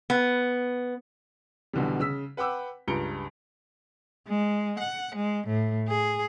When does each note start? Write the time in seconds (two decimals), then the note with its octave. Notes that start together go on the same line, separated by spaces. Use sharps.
0.10 B3
1.73 B1 B2 D3 E3 G3
2.00 C#3 E6 B6
2.37 B4 F#5 G5 B5 D6 E6
2.88 C#2 G2 A#5 C#7 D7 G7
4.28 G#3
4.79 F#5
5.15 G#3
5.47 A2
5.88 G#4